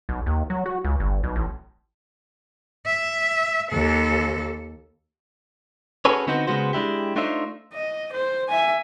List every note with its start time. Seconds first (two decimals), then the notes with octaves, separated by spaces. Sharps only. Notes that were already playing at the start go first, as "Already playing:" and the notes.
0.09 B1
0.26 D#2
0.50 F#3
0.66 F#4
0.85 C#2
1.00 G1
1.23 B1
1.36 A1
2.86 E5
3.71 D#2 A4
6.05 C#4 F#4 G#4 A4 B4 C#5
6.27 D3 B3 C4 D#4 F#4 C5
6.47 C#3 G#3 B3 F#4 C5
6.73 G#3 D4 E4 G4
7.16 A3 D4 D#4 F4 C5 E5
7.73 D#5
8.12 C5
8.48 E5 G#5